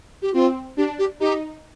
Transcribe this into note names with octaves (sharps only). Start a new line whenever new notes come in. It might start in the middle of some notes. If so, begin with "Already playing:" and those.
G4
C4 F4
D4 G4
G4
D#4 G4